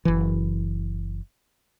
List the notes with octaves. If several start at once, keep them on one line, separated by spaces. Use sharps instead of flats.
F#1 E3